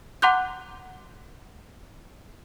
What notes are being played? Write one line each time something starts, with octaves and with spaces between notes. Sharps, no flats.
F#5 A#5 C6 D6 F#6 G6